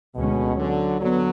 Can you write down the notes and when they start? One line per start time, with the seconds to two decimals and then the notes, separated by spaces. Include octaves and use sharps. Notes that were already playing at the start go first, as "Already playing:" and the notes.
0.15 D2 B2 D3 G#3 C#4
0.57 D3 F#3
1.01 D3 F#3 B3